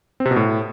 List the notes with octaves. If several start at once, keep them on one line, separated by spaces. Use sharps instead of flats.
C4
C3
B2
A2